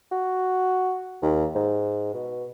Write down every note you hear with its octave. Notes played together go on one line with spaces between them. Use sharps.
F#4
D#2
G#2
B2